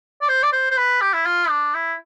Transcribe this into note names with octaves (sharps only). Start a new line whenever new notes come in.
D5
C5
D5
C5
C5
B4
G4
E4
F4
D4
E4